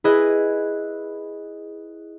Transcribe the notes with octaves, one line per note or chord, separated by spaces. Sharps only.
E4 G#4 B4 D#5